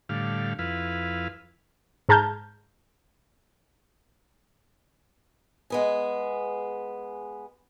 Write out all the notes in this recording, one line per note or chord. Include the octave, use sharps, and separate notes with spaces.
A2 D3 G3 F5
F2 E4 B4 F5
G#2 G#4 A5 A#5 F6 G6
G#3 B3 G#4